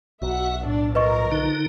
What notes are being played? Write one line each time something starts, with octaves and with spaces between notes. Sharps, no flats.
B1 F#4 E5 F#5
A2 D4 D5
F3 A#4 B4 D#5 C#6
D3 D#4